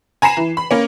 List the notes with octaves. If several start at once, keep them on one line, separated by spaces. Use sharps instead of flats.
G#5 A#5 B5 C7 E7
E3
B5
A#3 C#4